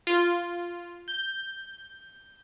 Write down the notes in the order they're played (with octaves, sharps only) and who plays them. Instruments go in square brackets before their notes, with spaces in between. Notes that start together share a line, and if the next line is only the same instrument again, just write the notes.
[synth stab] F4
G6